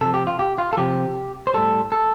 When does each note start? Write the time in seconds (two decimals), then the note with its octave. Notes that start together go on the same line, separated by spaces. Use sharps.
0.01 C3 A4
0.05 F3
0.14 G4
0.27 F4
0.39 G4
0.58 F4
0.73 A4
0.77 C3 F3 G4
1.47 C5
1.53 A2 G3 A4
1.92 A4